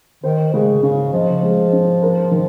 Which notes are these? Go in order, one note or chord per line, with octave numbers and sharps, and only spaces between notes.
D#3 C5
C#3 G#3
C#3 C#4
F3 D#5
G#3
C#4
A#4
D#3